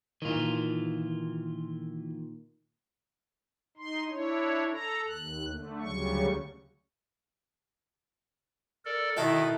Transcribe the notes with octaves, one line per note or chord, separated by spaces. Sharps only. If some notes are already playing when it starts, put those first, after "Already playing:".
A#2 D#3 E3 F4
D#4 C6
D4 E4 C#5
A4 A#5
D#2 F#6
D3 A3
D2 C#3 F#3 G3 C#6
A4 A#4 D5
B2 D#3 D#4 E4 A4